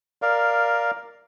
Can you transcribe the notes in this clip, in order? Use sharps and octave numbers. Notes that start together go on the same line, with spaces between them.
A#4 D5 F5